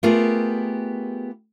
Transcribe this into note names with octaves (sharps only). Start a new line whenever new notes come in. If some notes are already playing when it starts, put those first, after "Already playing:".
A3 B3 F4 G4 G#4 A#4